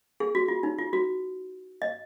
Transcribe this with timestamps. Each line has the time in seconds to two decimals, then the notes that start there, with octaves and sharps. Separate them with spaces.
0.20 G#4
0.35 F#4
0.48 F4
0.63 D#4
0.78 F4
0.93 F#4
1.82 D#5